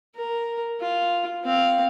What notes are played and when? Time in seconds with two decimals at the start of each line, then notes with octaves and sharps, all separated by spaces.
0.16 A#4
0.81 F4
1.44 C4 F5